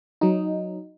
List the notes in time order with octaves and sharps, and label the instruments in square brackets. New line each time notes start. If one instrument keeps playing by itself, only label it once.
[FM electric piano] F#3 D#4